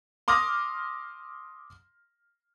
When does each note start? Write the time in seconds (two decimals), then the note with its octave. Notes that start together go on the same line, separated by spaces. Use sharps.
0.28 C6 D6 D#6 F6 A#6